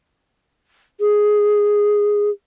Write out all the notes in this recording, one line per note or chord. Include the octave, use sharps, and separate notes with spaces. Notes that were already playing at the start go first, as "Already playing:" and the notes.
G#4